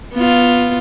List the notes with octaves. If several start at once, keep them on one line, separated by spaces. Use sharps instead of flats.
B3 F4